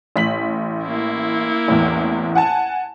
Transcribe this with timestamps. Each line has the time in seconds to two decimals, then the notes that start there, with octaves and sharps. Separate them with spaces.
0.16 A1 B6 F#7
0.84 A#3 E4
1.68 A1 E2
2.35 F#5 G#5 A5